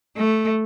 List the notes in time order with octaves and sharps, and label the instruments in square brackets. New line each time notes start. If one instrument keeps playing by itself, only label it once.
[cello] A3